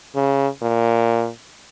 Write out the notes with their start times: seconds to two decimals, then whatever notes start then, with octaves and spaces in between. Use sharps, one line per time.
0.15 C#3
0.62 A#2